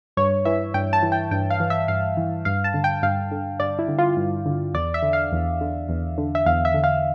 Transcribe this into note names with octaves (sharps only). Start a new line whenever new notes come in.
G2 C#5
E3 E5
G2 G5
A5
E3
G5
G2 G5
F5
E3
E5
G2 F5
E3
G2 F5
A5
D3
G5
G2 F5
D3
G2 D5
E4
D3
F4
G2
D3
E2 D5
E5
D3
F5
E2
D3
E2
D3
E5
E2 F5
E5
D3
F5